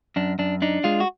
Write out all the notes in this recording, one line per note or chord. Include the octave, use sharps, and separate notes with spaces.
F#2 D4
F#2 D4
D4 D#4
G#3 F4
F#4